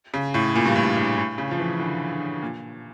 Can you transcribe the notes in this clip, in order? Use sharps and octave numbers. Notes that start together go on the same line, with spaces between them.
C#3
A2
A#2
G2
A2
A2
A2
C#3
F3
E3
D3
A#2